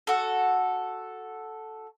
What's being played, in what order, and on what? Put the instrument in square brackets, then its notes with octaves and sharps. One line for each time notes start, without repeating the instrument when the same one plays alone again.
[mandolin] F#4 A4